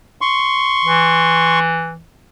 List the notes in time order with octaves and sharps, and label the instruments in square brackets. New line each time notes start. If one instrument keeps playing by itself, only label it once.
[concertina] C6 C#6
[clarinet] E3